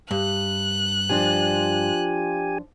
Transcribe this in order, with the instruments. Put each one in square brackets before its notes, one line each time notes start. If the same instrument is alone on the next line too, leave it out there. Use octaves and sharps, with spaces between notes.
[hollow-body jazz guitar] G2 [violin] F#6
[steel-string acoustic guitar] F3 D4 F4 [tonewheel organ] G4 G#5